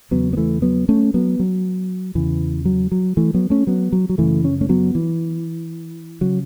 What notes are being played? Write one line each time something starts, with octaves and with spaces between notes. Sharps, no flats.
E2 C#3 F#3 B3
B3
E3 A3
F#3 B3
A3 C#4
F#3 B3
F#3
E2 C#3 E3
F#3
F#3
E3 A3
F#3 B3
A3 C#4
F#3 B3
F#3
F#3
F#2 C#3 E3 A3
C#4
A3 C#4
F#3 B3
E3
C#3 F#3